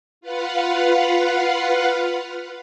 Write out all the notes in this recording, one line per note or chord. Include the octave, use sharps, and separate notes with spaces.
F4 B4 F5 F#5